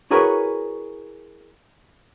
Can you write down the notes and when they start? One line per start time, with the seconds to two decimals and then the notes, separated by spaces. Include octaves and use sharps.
0.11 E4 F#4 G#4 A#4 B4 C#5